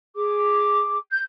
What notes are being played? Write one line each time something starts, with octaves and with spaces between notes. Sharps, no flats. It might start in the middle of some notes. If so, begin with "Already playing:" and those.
G#4 D6
G6